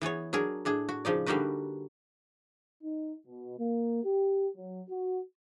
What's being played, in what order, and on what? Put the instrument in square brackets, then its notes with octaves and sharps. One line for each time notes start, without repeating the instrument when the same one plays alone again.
[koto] E3 B3 G#4 C#5
F#3 D4 G#4 A#4
A2 D4 G#4
F#4
C#3 F3 D#4 D5
D3 G3 A#3 D#4 F#4 B4
[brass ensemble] D#4
B2
A#3
G4
F#3
F#4